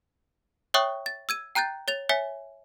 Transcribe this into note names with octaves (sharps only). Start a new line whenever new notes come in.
C#5 E5 G5 C#6 D#6 F#6
A6
E6 G#6 D#7
G5 A#5 F#6 G6 A6
C#5 A6 F7
C#5 E5 G#5 B6